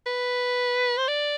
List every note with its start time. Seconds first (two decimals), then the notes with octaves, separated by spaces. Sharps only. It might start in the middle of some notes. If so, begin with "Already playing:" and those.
0.06 B4
0.97 C5
1.08 D5